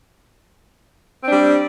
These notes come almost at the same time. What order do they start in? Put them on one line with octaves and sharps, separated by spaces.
C4 D4 G3